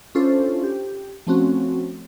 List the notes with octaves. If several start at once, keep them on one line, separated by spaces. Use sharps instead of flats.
C#4 D4 E4 F4 A4 C5
G4
F3 A3 C4 C#4 F#4